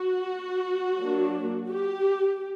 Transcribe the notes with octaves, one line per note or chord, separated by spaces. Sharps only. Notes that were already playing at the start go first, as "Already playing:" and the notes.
Already playing: F#4
F#3 A#3 D4
G4